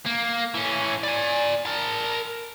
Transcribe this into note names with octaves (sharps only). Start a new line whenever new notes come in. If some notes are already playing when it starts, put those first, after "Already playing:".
A#3
E3 C#4
D5 G#5
A#4 A5